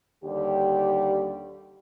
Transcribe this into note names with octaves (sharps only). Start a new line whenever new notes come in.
D#2 D3 G3 G4